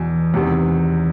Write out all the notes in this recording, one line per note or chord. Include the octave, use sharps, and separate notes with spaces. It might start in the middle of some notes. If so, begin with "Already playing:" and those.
Already playing: E2 B2 G#5
E2 C3 D#3